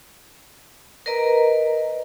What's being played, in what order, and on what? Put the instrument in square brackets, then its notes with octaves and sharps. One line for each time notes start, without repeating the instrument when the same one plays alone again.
[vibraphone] A#4 B4 D5 D#5 A#5